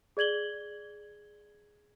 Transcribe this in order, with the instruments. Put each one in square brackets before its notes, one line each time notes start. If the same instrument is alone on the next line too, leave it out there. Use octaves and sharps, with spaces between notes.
[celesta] G#4 D5 G#6 F#7 G7